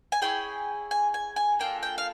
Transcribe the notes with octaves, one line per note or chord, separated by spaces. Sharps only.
G#5
C#4 E4 G#4 G5
G#5
G#5
G#5
A#3 D4 F4 A4 G5
G5
F5